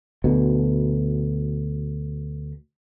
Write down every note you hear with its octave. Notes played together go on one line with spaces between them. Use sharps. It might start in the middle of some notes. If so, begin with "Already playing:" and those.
D2 B2